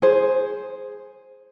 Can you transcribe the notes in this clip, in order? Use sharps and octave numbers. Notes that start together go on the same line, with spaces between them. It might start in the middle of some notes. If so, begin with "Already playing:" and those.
G#4 C5